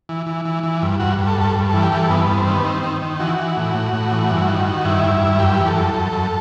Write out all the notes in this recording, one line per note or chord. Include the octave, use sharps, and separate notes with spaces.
E3
E3
E3
E3
G2
G2 F#4
G2
A4
G2 A4
G2
E3 A4
G4
E3 A4
G2 B3
G2 B3
C4
D#3 B3
D#3 C4
D#3
D#3
E3 F#4
E3
A2
A2
A2
E3
G2
D#3
D#3
G2 E4
G2
G2
F#2 G4
E3
A4
F#2
F#2
F#2